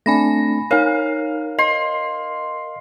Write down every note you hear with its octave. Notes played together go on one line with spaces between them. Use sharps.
A3 C4 D4 G#5 B5 A#6
D#4 A#4 C#5 F5
D#5 C6